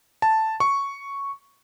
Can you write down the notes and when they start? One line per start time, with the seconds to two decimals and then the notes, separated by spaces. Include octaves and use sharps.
0.22 A5
0.60 C#6